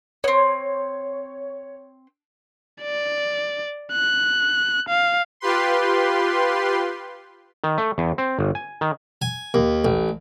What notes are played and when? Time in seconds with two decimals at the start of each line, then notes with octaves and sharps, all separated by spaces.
0.24 B3 C4 C#5
2.82 D5
3.92 F#6
4.89 F5
5.40 F4 G4 B4 C6
7.64 D#3
7.78 A3
7.98 E2
8.18 C4
8.39 G1
8.55 G#5
8.81 D#3
9.22 G#5
9.54 D#2
9.85 A1